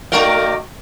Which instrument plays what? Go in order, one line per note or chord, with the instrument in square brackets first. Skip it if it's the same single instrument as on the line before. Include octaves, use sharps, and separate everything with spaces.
[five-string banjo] D#3 F#4 G5 [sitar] A3 A#4 D5